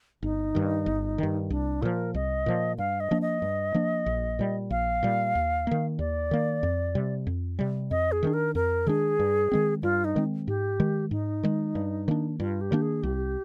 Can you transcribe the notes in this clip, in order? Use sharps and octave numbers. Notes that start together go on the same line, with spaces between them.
G1 D#4
G2 D#3
G1
G2 D#3
C2 D4
A#2 F3 A#4
C2 D#5
A#2 F3
G2 F5
D#5
F3 A#3 D4
D#5
G2
F3 A#3 D4
A#1
A#2 G3
A#1 F5
A#2 G3
D#2
D#3 A#3
D#2 D5
D#3 A#3
F2
C3 G3
F2
C3 G3
F2 D#5
G#4
D#3 G#3 D4
A#4
F2 A#4
D#3 G#3 D4 G#4
G2
D#3 G#3 C4
G2 F4
D#4
D#3 G#3 C4
G#2 G4
D#3 G#3
G#2 D#4
D#3 G#3
G2
D#3 A#3 D4
G2 F4
G4
D#3 A#3 D4
G#4
C2 G4